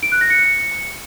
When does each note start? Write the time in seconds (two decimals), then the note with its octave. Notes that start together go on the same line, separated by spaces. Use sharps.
0.03 D7
0.12 F#6
0.21 A#6
0.30 C#7